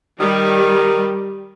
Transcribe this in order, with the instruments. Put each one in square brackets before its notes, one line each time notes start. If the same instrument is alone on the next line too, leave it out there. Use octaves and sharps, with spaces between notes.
[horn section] D#3 [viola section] G3